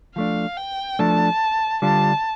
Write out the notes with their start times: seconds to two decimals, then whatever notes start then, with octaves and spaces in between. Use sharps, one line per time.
0.15 F3 A3 D4 F5
0.57 G5
0.99 F3 A3 D4 A5
1.82 D3 G3 D4 F4 A5